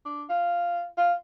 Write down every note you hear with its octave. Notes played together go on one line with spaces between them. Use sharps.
D4
F4
F4